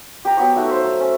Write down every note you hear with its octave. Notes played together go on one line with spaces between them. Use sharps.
G4 G5 A#5
F#3 B3 G4 C#6
A3 D#4 F#4 A4
C5 E5 F5
F#3
C#4